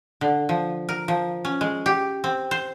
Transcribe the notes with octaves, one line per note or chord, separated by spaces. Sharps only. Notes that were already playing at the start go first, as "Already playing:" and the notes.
D3
F3
A#4
F3
C#4
G#3
G4
C4
C5